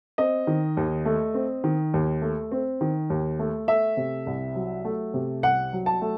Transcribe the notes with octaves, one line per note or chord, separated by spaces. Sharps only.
C4 D#5
D#3
D#2
A3
C4
D#3
D#2
A3
C4
D#3
D#2
A3
A3 E5
C3
C2
F#3
A3
C3
C2 F#5
F#3
A5
A3